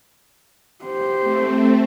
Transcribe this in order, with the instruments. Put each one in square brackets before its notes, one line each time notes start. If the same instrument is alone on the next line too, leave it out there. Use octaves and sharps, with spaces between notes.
[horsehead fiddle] G4 C5
[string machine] A3 C4